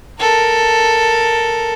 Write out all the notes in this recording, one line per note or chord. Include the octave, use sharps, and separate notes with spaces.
A4 A#4